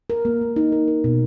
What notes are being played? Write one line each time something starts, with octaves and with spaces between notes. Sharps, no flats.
A#4
A#3
A#3
D#4
A#4
A#4
B2